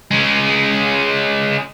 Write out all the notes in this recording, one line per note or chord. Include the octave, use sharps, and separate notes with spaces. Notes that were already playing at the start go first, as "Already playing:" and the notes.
G#3 C#4